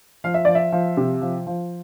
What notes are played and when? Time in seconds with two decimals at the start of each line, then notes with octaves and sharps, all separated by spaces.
0.24 F3 F5
0.34 E5
0.45 F3 D5
0.55 E5
0.72 F3
0.97 C3
1.22 F3
1.47 F3